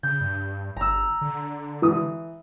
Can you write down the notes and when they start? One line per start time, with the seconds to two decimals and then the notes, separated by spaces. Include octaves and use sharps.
0.03 C#3 G6
0.21 G2
0.77 G1 A#5 E6
1.21 D3
1.82 E3 D#6